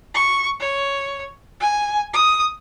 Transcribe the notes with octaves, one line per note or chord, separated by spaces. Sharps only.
C#6
C#5
G#5
D#6